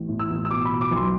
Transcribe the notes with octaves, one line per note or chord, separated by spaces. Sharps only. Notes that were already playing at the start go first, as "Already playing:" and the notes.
Already playing: A1
A2
E6
A1
E6
B2 D6
B5
B2
D6
B1 C6